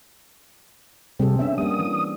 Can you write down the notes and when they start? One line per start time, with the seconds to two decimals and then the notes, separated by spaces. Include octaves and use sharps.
1.20 C3 G3 C4 G#4 A4
1.39 B3 C#4 D4 E5
1.58 G3 A#3 D#6
1.79 E3